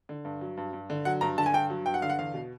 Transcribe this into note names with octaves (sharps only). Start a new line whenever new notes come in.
D3
G2
F#3
G2
G2
D3
F#3 F#5
G2 A#5
D3 A5
G#5
G2 G5
F#3
G2 G5
F#5
D3 F5
F#5
E2 F5
B2